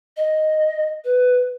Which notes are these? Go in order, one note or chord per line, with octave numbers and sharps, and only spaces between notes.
D#5
B4